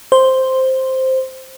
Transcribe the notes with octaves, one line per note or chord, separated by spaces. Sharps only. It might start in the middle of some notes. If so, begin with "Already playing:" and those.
C5